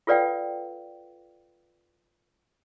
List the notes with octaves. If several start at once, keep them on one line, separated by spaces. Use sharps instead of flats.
F4 A4 B4 D5 F5 G5